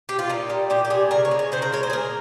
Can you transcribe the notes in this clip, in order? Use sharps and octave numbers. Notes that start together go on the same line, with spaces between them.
G4
F4
A#2 D#4
G3
A#2 G4
G4
G3 G#4
C#3 A#4
C#5
G#3
C#5
C#3 C5
A#4
G#3 C#5
C5
G#4
A#2 A#4